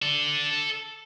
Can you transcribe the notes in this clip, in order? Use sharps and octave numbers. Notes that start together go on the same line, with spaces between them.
A4 D5